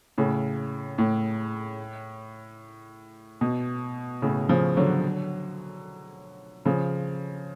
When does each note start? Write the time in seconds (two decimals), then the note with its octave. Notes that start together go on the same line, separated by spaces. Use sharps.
0.18 A2 C#3
0.98 A2
3.41 B2
4.22 A2 C#3
4.49 C#3 F3
4.77 D3 F#3
6.65 C#3 F3